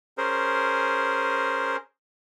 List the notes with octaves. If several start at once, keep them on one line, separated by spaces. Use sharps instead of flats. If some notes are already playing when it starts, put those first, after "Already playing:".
C#4 G#4 A#4 C5